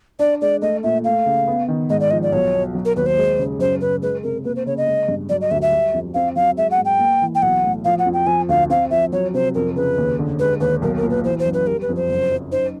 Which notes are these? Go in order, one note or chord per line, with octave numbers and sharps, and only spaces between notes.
D4 D5
G#3 D5
A3 D#5
A#2 E5
A3 F5
C#3
B3
D#3
G#2 D#5
D5
F3 D#5
D5
B1 C#5
B2
F#3
A#4
D#2 B4
C5
G#3
C#3
F#2 C5
C#3 B4
G#3 B4
C3 A#4
A#3 B4
C5
C#3 C#5
D#5
G#3
G2
F#3 D5
D#5
D2 E5
E5
G3
F2
C4 F5
F#3 F5
G#3 E5
F#5
G#2
G5
A#3
E3
G5
B1 F#5
A2
F3 F5
F#5
F2
G5
F3 G#5
D2 F5
C4 F5
F3 E5
F#3 C#5
C3 C5
F2 A#4
C#3 B4
D#2
D3
G#3 B4
D#2 B4
B1 A#4
A#4
A#2
B4
E3 C5
C5
F#2
B4
G3 A#4
B4
F2
C5
F#1
F#2
D#4 C5